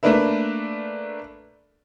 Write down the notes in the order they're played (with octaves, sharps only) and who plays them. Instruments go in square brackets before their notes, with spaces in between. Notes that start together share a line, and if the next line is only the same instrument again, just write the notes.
[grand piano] A3 A#3 D4 A#4 B4 E5